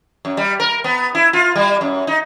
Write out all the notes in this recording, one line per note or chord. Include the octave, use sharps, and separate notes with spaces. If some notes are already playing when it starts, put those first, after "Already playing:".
F#2
G3
A#4
B3
E4
F4
G3
F#2
D#4